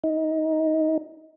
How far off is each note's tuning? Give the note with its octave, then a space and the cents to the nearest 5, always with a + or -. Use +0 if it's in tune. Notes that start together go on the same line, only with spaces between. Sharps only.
D#4 +20